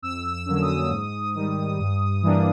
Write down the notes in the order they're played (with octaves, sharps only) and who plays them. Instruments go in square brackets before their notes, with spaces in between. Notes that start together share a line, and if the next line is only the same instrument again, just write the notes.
[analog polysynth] F2 E6
E6
D3 F#3 A#3 C#4
D#6
G#2
D#3 G3
G2
E3 G3 A#3 D4